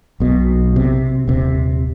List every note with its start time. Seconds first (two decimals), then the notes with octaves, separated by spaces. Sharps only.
0.20 B1 B2
0.76 C3
1.28 D#1 C3